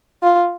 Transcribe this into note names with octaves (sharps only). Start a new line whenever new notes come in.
F4